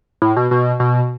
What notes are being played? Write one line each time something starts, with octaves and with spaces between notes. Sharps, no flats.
A2
B2
B2
B2